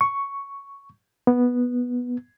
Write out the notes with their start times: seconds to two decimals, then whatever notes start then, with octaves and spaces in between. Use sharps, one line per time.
0.01 C#6
1.27 B3